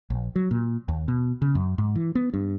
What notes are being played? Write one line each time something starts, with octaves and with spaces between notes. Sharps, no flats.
A#1
F#3
A#2
D#2
B2
C#3
F#2
G#2
E3
B3
G2